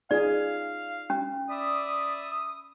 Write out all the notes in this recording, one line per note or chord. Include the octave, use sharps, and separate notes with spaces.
D#4 F4 G#4 D5 F5
C#4
D5 E5 B5 D#6